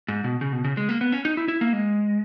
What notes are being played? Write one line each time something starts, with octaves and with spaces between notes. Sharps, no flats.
G#2
B2
C#3
B2
C#3
G#3
A#3
B3
C#4
D#4
E4
E4
A#3
G#3